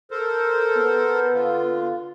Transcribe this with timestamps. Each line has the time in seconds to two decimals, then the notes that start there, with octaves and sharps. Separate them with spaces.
0.11 A4 A#4 C5
0.77 B3
1.33 D3 F4